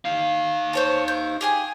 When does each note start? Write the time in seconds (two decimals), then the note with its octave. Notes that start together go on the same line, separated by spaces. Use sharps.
0.05 D#4 F5
0.73 C5 C#5 A5
1.08 G6
1.41 G4 G#4 G#5